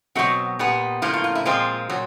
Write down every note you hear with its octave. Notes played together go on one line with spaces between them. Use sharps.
B2 F#3 A3 C4 F#4
A#2 G3 B3
A2 F3 A#3 F4
F4
F4
E4
A#2 F3 G#3 C4 F4
A#2 F#3